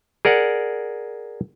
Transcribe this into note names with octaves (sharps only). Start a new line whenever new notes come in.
G#4 A#4 D5 F#5